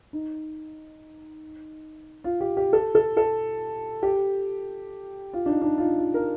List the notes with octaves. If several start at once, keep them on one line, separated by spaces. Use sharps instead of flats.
D#4
F4
G4
G4
A4
A4
A4
G4
F4
D4
D#4
D4
D#4
F4
D#4
F4
A#4